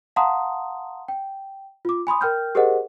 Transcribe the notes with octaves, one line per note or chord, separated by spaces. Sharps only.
F5 F#5 A5 A#5 C6 D#6
G5
F4 D6
G#5 B5 C6 D#6
A#4 G5 F6 G6
G4 G#4 A#4 C5 D#5 F#5